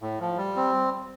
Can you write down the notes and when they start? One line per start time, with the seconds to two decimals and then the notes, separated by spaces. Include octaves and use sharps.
0.02 A2
0.20 F3
0.37 G3
0.56 C4